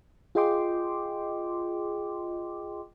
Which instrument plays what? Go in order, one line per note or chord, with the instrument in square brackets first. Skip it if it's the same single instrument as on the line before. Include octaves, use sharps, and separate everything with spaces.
[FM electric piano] F4 G#4 D#5 G5 C6 D6